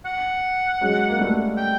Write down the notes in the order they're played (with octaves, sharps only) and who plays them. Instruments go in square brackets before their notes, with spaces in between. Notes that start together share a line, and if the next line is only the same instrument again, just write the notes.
[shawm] F#5
[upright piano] F#3 G#3
A#3
G3 A3
[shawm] G5